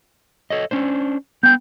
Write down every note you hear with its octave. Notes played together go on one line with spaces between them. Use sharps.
A4 C#5 D#5
C#4 D4 C5
B3 G5 G6